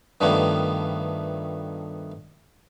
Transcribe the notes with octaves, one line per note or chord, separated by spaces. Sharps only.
G2 D#3 F3 G3 A3 B3